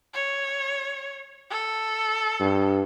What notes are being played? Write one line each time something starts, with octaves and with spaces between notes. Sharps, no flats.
C#5
A4
G2